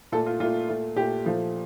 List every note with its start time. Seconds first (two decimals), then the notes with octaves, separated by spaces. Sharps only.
0.12 A#2 A4
0.16 A3
0.26 F4
0.40 A#2 A3 F4
0.68 A#2 A3
0.96 A#2 A3 G4
1.25 A#2 F3 A3